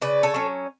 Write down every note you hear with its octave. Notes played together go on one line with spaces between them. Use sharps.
C#3 B4 D5
A4 C#5
F#3 C#4